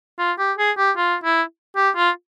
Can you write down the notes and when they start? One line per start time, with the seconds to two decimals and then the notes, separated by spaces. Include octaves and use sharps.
0.19 F4
0.38 G4
0.57 G#4
0.77 G4
0.97 F4
1.24 E4
1.76 G4
1.96 F4